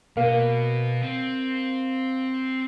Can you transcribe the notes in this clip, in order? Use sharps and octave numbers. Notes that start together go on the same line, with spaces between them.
B2 A#3
C4